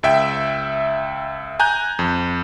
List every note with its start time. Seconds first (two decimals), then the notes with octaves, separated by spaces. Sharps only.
0.03 C#2 E5 G5
1.60 G#5 A#5 F#6 G6
1.99 F2